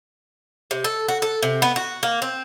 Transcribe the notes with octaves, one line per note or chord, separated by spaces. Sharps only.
C3
A4
F#4
A4
C3
B3
F#4
A#3
C4